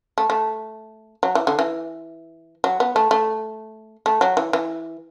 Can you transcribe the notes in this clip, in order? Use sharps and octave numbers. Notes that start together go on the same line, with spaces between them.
A3
A3
F#3
E3
D3
E3
F#3
B3
A3
A3
A3
F#3
E3
E3